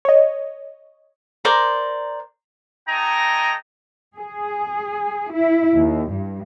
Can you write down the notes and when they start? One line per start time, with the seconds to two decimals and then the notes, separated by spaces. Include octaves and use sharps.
0.05 C#5 D#5
1.45 A#4 C5 D5 A#5
2.88 A3 D#4 D#5 G5 G#5 A#5
4.16 G#4
5.32 E4
5.78 D#2
6.12 G2